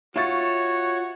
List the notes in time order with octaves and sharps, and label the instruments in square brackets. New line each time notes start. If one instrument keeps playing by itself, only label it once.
[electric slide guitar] F4 E5 [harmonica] F#4 [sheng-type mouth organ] C#5 [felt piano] F5 C#6 A6